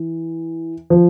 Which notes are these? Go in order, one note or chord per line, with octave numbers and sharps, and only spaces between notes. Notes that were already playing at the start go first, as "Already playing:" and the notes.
Already playing: E3
F3